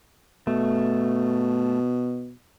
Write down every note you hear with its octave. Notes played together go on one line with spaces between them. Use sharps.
B2 A3